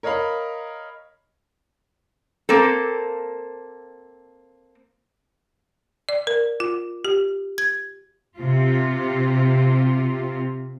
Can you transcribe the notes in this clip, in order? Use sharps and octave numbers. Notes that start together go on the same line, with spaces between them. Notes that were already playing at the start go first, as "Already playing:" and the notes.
A#4 C#5 D#5 F5 B5
A#3 C4 A4
D5
A#4
F4
G4
G#6
C3 F4